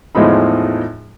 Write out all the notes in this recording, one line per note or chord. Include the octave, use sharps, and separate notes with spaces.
E2 A2 F3 G#3 D#4 B5